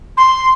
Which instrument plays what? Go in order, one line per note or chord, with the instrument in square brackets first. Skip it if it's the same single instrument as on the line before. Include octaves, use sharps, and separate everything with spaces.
[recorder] C6